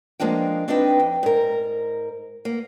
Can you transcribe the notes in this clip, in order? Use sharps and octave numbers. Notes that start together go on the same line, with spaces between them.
F3 G#3 A#3 D4 G5
C4 D4 D#4 B4 D#5 G5
F2
G#2 A#4
A#3